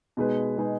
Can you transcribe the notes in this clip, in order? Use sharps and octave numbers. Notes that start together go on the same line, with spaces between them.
B2 G#3 D#4 G#4 B4
B2 G#3 D#4 G#4 B4